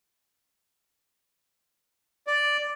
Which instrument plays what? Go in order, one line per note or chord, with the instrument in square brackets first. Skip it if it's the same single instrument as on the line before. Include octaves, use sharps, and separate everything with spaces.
[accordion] D5